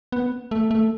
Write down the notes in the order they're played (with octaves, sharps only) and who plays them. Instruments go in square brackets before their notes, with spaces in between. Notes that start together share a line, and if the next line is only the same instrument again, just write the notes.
[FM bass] B3
A3
A3